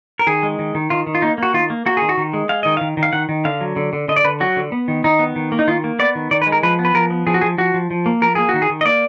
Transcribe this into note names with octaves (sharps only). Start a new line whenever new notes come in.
A#4
D#3 G#4
G#3
D#3
D#3
D#3 F4
D#3
F4
A#3 D#4
A#3 F#4
D#3 F4
A#3
A#3 F#4
D#3 G#4
F#4
D#3
G#3
G#3 F5
D#3 D#5
D#3 F5
D#3
F5
D#3 F#5
D#3
D3 F5
F#3
D3
D3
D3 D#5
D5
D3 B4
F#3 F#4
D3
B3
D#3
D#3 D#4
B3
D#3
A#3
D#4
D#3 F4
A#3
B3 D5
D#3
D#3 D5
B4
G#3
A#4
F3 B4
B3
B4
F3 A#4
B3
F3 G#4
F#4
F3 G#4
F3 F#4
F3
F3
A#3
F3 A#4
A#3 G#4
D#3 F#4
G#4
D#3
D#5
A#3 D5